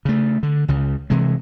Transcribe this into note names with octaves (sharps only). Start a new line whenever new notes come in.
C#3 A3
D3
C#2 C#3
C3 E3 G#3